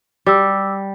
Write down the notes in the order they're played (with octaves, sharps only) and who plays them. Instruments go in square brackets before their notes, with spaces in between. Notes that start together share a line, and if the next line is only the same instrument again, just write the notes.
[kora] G3 [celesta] D6 E6